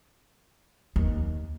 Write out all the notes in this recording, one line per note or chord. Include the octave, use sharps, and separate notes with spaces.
D#2